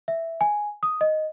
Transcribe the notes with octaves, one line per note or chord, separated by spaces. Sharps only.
E5
G#5
D#6
D#5